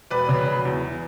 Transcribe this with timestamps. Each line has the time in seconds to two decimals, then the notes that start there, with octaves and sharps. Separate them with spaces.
0.10 E1 B4 D5
0.29 C#3
0.47 F#3
0.65 E2